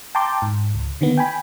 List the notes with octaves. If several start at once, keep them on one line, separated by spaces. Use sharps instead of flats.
G5 A5 A#5 C6 D6 G6
G#2
C#2
D3 D#3 A#3 B3
G5 G#5 B5